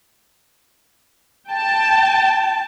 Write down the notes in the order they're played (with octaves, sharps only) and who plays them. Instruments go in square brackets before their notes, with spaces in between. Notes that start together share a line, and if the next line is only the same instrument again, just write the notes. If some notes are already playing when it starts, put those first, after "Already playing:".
[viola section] G5 A5